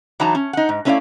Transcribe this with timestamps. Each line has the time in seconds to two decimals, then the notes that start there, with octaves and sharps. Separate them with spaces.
0.20 E3 F#3 D#4 A5 A#5
0.35 C#4
0.53 D#4 F#5
0.69 G#2
0.85 A3 C#4 E4 C5 D5 F5